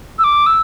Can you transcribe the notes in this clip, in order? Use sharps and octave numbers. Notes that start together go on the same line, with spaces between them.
E6
D6
E6